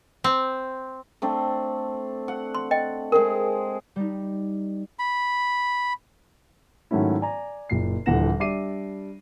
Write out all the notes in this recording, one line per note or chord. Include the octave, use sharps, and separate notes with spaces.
C4
A3 C4 D4
F#5
C6
D#5 G5
G#3 C4 G#4 A#4
G3 D#4
B5
G#2 D#3 F#3 A3 C#4 E4
D5 G#5 A#5
F#1 A#2 C7
D#1 D3 E3 F#5 A#6 E7
G3 D4 E5 D6 C7 D#7